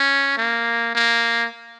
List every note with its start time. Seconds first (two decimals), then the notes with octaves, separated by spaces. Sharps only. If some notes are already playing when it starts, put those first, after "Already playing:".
Already playing: C#4
0.38 A#3
0.95 A#3